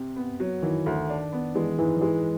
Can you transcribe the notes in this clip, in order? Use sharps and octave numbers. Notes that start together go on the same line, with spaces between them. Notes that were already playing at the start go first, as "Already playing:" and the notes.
Already playing: C3
B3
F#3
D#3 E3
D2
D4
B3
E3 G#3
G#2 E3
F3
E3 G#3